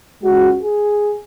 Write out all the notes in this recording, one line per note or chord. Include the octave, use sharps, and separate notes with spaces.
C#2 C#3 G#3 F#4
G#4